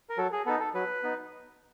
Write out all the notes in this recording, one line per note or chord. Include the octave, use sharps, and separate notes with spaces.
A#4
F#3 A4
G#4
B3 D#4 A4
A4
F#3 B4
B3 D#4